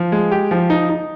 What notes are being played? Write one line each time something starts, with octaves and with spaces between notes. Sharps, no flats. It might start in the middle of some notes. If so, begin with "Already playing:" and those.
Already playing: F3
G#3
G4
F3
D#4
D#4